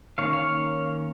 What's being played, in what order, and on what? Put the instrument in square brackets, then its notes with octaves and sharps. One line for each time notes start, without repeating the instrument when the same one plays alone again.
[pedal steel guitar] D#3 A#3 C#4 C#5 F5
C#5 F5